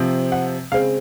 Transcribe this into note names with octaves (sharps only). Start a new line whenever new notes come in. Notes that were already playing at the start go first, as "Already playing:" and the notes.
Already playing: C3 F3 C4
F#5
C#3 G#3 C4 F5